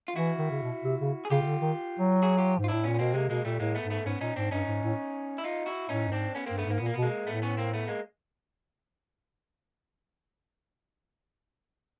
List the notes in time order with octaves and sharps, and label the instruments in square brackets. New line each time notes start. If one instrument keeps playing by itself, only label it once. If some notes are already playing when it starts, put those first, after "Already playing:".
[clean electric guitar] F4
[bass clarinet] E3 [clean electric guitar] E4 F#4
[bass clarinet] D#3
C#3
B2
C3
C#3
[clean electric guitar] G#4
[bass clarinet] C#3 [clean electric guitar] F4 G4
[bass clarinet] C#3
D3
D#3
F#3
[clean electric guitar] F#4 G#4
F4 G4
[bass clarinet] G#2
[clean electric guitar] F4
[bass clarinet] A2 [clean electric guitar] D4 E4
[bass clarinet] A#2 [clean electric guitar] B3 C#4
[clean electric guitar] B3
[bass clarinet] B2 [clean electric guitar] A#3 C4
[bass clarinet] C3 [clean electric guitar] G#3 A#3
[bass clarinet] B2 [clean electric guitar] G#3 A#3
[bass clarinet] A#2 [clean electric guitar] G3 A3
[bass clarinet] A2 [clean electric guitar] G#3 A#3
[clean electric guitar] A3 B3
[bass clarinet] G#2
[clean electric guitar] A3 B3
[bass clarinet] G#2 [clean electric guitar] B3 C#4
[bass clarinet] A#2 [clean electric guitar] C#4 D#4
[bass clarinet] G#2 [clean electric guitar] C4 D4
[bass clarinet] G2 [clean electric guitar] C#4 D#4
[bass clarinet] G#2
A2
[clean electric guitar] E4
D#4 F4
E4 F#4
[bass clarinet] A2 [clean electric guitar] C#4 D#4
[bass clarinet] G2
[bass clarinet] G#2 [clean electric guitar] C4 D4
[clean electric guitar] B3 C#4
[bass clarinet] G2 [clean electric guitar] A#3 C4
[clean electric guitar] A3 B3
[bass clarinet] G#2 [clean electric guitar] A#3
[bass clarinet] A#2 [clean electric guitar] B3
[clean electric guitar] A#3
B3
[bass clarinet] B2
[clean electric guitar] G#3 A#3
[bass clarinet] A2 [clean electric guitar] A3 B3
[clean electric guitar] B3 C#4
A#3 C4
A3 B3
G#3 A#3